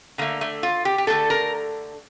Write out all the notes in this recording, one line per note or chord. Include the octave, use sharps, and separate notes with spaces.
D3 A3 A#3
A3
F4
G4
G4
D3 A3 A4
A#4